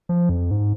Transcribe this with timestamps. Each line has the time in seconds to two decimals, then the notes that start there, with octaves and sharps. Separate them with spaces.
0.09 F3
0.29 F2
0.51 G#2